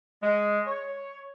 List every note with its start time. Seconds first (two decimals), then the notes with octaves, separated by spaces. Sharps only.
0.23 G#3
0.66 C#5